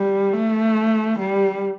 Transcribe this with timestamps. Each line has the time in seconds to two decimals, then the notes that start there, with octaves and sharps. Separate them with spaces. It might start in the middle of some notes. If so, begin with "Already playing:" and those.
Already playing: G3
0.33 A3
1.19 G3